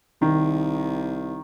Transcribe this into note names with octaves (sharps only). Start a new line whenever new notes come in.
C2 D#3